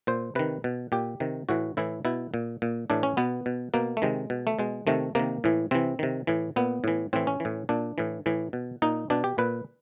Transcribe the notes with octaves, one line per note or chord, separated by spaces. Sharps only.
A#2 C5
C3 D#3 B4
B2
A#2 G4
C3 D#3
A2 E3 F#4
A2 E3 E4
B2 E4
A#2
A#2
A2 E3 D4
C#4
B2 B3
B2
B2 A#3
A3
C3 D#3 G#3
B2
A3
B2 G#3
C3 D#3 A3
C3 D#3 A#3
A2 E3
C3 E3 C4
C3 D#3
A2 E3
A#2 B3
A2 E3
A2 E3 C4
C#4
A2 E3
A#2 D4
A2 E3
A2 E3
B2
A#2 D#4
B2 D4
G4
A#2 B4